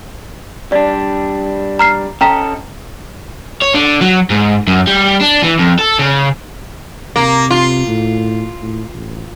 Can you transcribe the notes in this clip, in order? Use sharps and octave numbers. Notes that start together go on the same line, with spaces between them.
G3 D4 D5
A#5 F6 C7
C#4 A4 D#5 G5 A#5 B6
C#5
D3
F#3
G#2
F#2
G3
D4
E3
F2
A4
C#3
C3 A#3
F4
A2
A2
A1